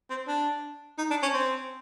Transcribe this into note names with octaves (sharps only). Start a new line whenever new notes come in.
C4
D4
D#4
D4
C#4
C4